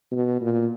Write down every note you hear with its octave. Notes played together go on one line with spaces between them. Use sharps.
B2
A#2